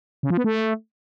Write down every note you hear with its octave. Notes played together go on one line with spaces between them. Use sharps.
C#3
F3
B3
A3